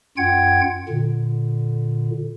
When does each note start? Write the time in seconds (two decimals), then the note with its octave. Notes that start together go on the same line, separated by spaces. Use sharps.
0.17 F#2 F4 F#5 G5 G#6
0.89 A#2 D3